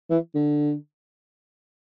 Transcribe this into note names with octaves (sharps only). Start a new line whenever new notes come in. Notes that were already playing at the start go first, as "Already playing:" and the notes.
E3
D3